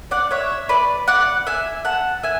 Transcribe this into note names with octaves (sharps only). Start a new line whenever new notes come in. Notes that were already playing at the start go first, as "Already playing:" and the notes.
D5 F#5
C#5 E5
B4 D5
D5 F#5
E5 G#5
F#5 A5
E5 G#5